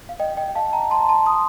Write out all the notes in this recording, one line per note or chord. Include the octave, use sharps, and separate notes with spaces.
F5
D#5 G5
D#5 G5
F5 A5
G5 A#5
A5 C6
A#5
A5 C6
C6 D#6